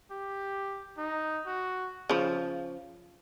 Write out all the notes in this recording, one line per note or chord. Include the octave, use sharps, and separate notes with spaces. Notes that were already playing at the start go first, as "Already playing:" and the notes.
G4
D#4
F#4
C#3 F3